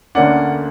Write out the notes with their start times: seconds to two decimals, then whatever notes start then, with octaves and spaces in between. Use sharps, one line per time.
0.15 D2 D3 A#3 C#4 D5 F#5